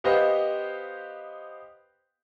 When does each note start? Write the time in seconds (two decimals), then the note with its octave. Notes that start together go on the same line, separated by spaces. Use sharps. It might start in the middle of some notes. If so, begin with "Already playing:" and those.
0.04 B3 G4 B4 C5 D#5 F5